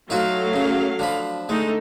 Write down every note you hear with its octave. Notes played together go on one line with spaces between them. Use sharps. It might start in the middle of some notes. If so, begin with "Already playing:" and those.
F#3 A3 D#4 F4 F#4 F5
F#2 C#3
D3 F3 B5
D3 G#3 A3 D#4